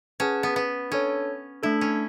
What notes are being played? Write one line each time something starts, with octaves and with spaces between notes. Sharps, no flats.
C#4 G#4 B4 F#5 A5
B3
B3
C#4 D4 A4 C#5
A3 D4 E4 A4
C#4